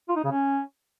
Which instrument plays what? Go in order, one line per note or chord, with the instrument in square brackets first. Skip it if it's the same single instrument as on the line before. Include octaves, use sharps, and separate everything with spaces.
[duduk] F4
D#4
C#3
C#4